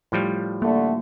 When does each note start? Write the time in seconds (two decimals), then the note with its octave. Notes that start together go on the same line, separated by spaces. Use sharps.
0.12 A2 F3 G3
0.62 D3 A3 A#3